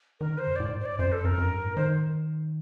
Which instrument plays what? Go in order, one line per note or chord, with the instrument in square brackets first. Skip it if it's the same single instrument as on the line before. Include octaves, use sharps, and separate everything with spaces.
[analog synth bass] D#3 [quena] A#4
[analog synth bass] D3 [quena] C5
[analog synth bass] F#2
[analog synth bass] A2 [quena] D5
[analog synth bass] G2
[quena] C5
D5
[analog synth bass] F#2 [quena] C5
[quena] A4
[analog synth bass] F#2 [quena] A#4
[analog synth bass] F#2
G2
A2
[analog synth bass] D#3 [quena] C5